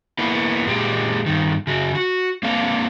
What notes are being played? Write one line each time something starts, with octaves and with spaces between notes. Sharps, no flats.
A#3 B3 E4
A#2 G#3 G4
G2 D#3
C#3 F#4
F#4
A#3 C4 D4 A4 F5